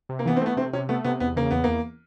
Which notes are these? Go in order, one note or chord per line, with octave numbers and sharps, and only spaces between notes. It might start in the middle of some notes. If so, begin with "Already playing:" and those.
C3
A#3
E3 B3
C4
A3 B3
C3 C4
C3 C#4
A3 B3
C3 B3
E2 B3
C#3 A#3
E2 B3
E2 A#3